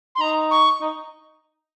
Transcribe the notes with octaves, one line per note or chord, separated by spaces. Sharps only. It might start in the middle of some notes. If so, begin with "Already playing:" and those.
C6
D#4 A#5
C#6
D#4